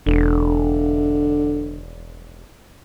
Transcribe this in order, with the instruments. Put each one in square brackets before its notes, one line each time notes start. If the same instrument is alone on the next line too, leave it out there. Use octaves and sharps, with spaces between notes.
[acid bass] E1 [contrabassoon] D3